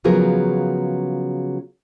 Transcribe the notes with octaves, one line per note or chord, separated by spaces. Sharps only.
C#3 F3 F#3 B3 G#4 A#4